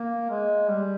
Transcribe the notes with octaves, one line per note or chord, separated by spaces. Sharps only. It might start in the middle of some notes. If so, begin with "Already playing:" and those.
Already playing: A#3
G#3
G3